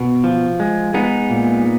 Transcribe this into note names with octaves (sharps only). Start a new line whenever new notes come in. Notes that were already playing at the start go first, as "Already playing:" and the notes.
Already playing: B2
F3
G#3
G#3 B3 D#4
A#2